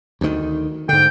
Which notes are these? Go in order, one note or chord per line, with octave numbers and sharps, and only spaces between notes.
D2 D#3
G#2 D3 G5